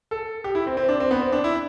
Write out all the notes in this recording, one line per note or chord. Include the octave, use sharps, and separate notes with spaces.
A4
G4
E4
C4
C4
D4
C4
B3
C4
D4
E4